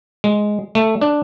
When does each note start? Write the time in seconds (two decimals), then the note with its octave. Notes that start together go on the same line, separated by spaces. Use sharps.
0.24 G#3
0.75 A3
1.01 D4